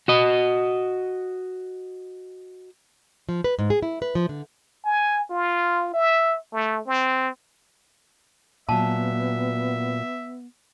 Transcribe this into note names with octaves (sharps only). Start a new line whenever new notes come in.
F#4 D#5
F3
B4
G#2
G#4
E4
B4
F3
D3
G#5
F4
E5
A3
C4
A#2 F#3 B3 E5 A5